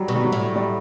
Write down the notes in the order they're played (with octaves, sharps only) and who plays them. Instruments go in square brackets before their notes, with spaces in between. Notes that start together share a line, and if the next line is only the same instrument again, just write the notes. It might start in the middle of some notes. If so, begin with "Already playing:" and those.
Already playing: [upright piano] F#3 G3
[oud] B2
[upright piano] G3
F#3
[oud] A2
[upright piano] G3